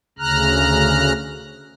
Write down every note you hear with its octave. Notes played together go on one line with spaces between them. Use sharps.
D2 C#3 A#5 F6 F#6